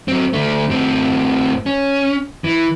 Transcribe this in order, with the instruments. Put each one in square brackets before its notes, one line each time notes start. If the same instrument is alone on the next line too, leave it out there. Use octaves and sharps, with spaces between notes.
[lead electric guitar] F#3 C4
D3 A3
A2 C4
C#4
E3